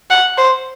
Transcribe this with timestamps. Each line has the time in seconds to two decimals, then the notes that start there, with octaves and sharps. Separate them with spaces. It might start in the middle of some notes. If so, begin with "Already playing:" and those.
0.10 F#5
0.38 C5